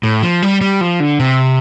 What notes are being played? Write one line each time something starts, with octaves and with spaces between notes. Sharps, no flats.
A2
F3
G3
G3
F3
D3
C3